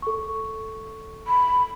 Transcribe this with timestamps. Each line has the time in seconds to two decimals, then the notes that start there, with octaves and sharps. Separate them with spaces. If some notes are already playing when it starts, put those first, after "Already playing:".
0.02 A4 C#6
1.27 B5